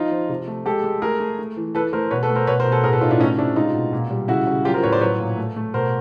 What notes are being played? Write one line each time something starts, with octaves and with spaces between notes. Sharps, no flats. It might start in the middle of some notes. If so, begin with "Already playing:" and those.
Already playing: F3 D#4 F4
F3
C3
A3
G#3 G4 A4
G#3
A3 G#4 A#4
A3
A3
E3
E3 A4 B4
A3 A#4 C5
B2 B4 C#5
A4 B4
A3
A#4 C5
B2 B4 C#5
A#4 C5
B2
A4 B4
A2 G#4 A#4
A4 B4
A2 D#4 F4
D4 E4
A3 C#4 D#4
C3 D4 E4
G#3 D#4 F4
B2
A#2
G3
C#3 E4 F#4
C#3
F#3 F4 G4
A#4 C5
A2 B4 C#5
C5 D5
F#3 B4 C#5
A#2
A3
A3
B2 A#4 C5